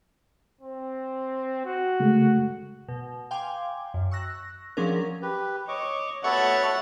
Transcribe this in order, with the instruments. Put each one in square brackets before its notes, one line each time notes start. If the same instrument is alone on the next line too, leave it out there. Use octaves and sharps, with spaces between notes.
[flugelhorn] C4
F#4
[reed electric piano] C#3 G#3 A3
[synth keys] B2
F5 G5 G#5 C6 D6
F#2
C#6 E6 F#6 A#6
F3 F#3 C#4 D4 G#4 A#4
[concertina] G4 B4
[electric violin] C#5 [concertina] D#5 C#6 D6
[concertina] B3 F#4 A4 [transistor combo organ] C#5 [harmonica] E5 A5 [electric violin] F#5 A6